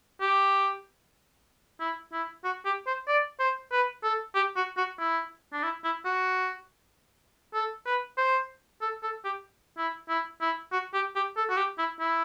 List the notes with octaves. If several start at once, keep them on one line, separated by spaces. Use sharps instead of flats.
G4
E4
E4
F#4
G4
C5
D5
C5
B4
A4
G4
F#4
F#4
E4
D4
E4
E4
F#4
A4
B4
C5
A4
A4
G4
E4
E4
E4
F#4
G4
G4
A4
F#4
G4
E4
E4